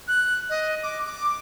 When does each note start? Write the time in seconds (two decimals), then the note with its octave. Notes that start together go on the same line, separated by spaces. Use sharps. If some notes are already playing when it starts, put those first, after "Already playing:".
0.08 F#6
0.50 D#5
0.83 D6
1.06 D6